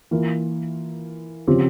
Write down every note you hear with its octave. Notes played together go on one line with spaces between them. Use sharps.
E3 A#3 F4 A#4
C#3 F3 C4 G4